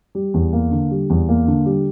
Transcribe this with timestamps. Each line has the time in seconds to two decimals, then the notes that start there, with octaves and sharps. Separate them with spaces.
0.15 G3
0.34 E2
0.53 A#3
0.71 D3
0.91 G3
1.10 E2
1.29 A#3
1.48 D3
1.66 G3